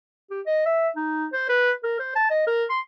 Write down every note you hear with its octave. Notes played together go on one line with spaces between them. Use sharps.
G4
D#5
E5
D#4
C5
B4
A#4
C5
A5
D#5
A#4
C6